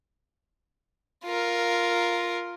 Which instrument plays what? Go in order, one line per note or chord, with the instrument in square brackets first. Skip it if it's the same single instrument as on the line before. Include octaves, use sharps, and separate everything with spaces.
[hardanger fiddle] F4 A#4